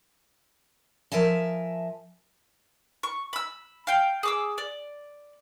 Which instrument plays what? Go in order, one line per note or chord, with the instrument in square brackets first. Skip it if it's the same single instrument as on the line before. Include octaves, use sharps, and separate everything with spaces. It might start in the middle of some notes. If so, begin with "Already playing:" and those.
[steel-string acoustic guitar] F3 A#4 E5 G#5 A5
[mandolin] C#6
B5 E6
F5 G5
G#4 D6 E6
D5